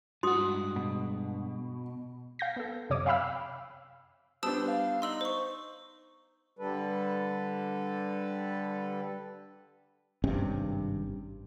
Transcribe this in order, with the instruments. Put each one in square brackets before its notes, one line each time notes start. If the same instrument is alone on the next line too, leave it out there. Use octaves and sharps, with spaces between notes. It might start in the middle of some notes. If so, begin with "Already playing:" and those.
[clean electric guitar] G2 G#3 F#5 [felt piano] F#4 [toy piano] C6 D#6
[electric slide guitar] B2
[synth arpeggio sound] F5 G6 A#6
B3 A4
F#2 C3 C#5 D6 D#6
E5 F5 G5 B5 E6 F6
[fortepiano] G3 B3 D4 [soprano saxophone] C5 [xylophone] A5 D#6 E6
[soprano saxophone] F5
[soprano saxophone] D#4 [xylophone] C6 E6 F#7
[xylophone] C5 C#6
[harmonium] D3 G3 A4 B4
[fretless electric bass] G#1 G2 C3 C#4